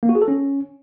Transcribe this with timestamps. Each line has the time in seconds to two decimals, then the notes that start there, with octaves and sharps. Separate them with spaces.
0.03 A#3
0.09 F#4
0.15 G#4
0.22 A4
0.28 C#4